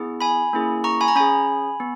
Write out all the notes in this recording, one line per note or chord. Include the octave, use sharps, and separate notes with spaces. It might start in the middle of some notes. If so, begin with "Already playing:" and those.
Already playing: B3 E4 G#4
G#5 B5
A#3 C#4 E4 G#4
A#5 C#6
G#5 B5
A#5
C#4 G#4 G#5 B5
B3